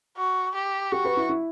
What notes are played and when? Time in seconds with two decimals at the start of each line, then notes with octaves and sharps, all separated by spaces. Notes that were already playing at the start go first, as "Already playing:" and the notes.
0.17 F#4
0.55 G4
0.92 F#4 G4
1.05 B4
1.17 E4
1.29 E4